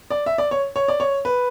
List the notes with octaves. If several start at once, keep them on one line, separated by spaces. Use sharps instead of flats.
D5
E5
D5
C#5
C#5
D5
C#5
B4